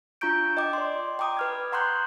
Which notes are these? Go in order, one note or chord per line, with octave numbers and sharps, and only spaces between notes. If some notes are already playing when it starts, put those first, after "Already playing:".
D4 F4 A#5 C#6 G6 D7
D#5 G5 D6
D5 C6
G5 A#5 D6 D#6
B4 F6 G#6
F#5 A#5 C6 C#6 F#6 G6